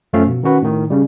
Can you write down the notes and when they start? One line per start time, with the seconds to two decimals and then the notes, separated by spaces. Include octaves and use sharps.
0.13 F#2 F3 A3 C#4 E5 F5
0.27 B2
0.43 D#3 C#4 F#4 B4
0.62 A2 D#3
0.90 C#3 G3